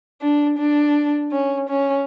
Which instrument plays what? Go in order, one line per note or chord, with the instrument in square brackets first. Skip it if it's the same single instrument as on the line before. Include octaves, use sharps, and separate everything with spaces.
[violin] D4
D4
C#4
C#4